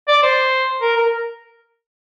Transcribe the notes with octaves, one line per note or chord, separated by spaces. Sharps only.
D5
C5
A#4
A#4